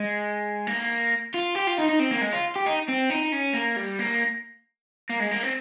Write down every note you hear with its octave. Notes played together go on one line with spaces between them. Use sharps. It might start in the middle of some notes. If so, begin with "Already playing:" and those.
Already playing: G#3
A#3
F4
G4
F4
D#4
D#4
C4
A#3
G#3
F4
G4
D#4
C4
D#4
C#4
A#3
G3
A#3
A#3
G#3
A#3
C4